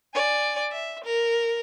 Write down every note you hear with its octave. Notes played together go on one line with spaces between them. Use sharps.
D5 G#5
E5
A#4